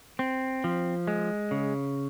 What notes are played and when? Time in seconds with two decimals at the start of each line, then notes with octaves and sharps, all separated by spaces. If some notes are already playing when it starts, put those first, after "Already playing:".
0.19 C4
0.64 F3
1.07 G#3
1.51 C#3